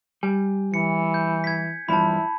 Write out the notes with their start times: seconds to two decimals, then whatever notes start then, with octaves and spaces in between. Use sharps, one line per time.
0.23 G3 G#5
0.74 E3 C#7
1.14 G6
1.44 G#6 B6
1.89 E2 G2 F3 E4 A5 B5